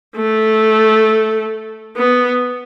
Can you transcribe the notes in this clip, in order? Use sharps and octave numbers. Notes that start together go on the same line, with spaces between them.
A3
B3